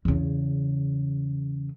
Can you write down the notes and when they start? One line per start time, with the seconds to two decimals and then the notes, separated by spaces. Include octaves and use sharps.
0.05 E2 C#3